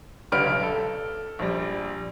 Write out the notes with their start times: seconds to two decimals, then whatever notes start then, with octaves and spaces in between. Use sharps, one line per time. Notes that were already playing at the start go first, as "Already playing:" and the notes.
0.32 C#2 D3 G3 B4 F6 D7
0.46 B1
0.63 A4
1.39 A#1 G3